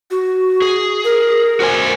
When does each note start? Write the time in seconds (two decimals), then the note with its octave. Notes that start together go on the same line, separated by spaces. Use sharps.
0.11 F#4
0.62 G#4
1.04 A#4
1.60 F#4 C5 G#5